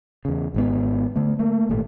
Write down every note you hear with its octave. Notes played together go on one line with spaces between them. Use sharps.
E2 C#3
G#1 G#2 B3
D3 A3
A3 A#3
G#1 A#2 A3